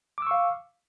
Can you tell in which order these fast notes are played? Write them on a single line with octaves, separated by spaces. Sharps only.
D6 E6 C#6 F5